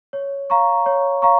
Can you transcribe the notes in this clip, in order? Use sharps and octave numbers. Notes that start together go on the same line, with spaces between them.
C#5
F5 A#5 C#6
C#5
F5 A#5 C#6